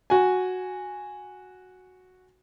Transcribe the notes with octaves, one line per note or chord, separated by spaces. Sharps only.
F#4 G#5